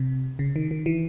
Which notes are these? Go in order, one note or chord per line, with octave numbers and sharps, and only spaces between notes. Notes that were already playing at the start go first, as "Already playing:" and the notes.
Already playing: C3
C#3
D#3
D#3
E3